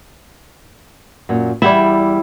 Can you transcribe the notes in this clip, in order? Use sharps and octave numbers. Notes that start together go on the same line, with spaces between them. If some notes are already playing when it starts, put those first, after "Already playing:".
F#2 A#2
E2 G3 E4 D5